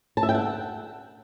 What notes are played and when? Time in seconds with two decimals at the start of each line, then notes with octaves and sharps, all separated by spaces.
0.17 A5
0.23 E5
0.29 G5
0.35 F#5